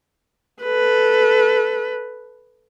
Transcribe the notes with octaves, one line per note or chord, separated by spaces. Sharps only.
A4 B4